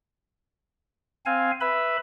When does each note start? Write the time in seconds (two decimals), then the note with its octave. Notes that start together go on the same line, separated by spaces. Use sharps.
1.26 C4 F5 G#5
1.61 B4 E5 B5